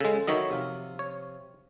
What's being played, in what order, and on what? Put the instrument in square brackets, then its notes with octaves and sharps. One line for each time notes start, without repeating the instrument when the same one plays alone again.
[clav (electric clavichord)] C#3 G#3 [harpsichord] A4
[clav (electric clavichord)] D#3 F#3 D#5 [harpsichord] C#5 E5 B5
[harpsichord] C3 F3
[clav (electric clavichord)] C#5